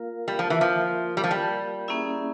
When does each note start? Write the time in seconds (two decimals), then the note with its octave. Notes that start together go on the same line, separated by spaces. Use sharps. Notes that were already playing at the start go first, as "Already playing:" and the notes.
Already playing: A#3 F4 A#4 F5
0.28 G3
0.39 F3
0.50 E3
0.61 F3
1.17 G3
1.24 F3
1.31 G3
1.88 A#3 C#4 E4 G#4 E5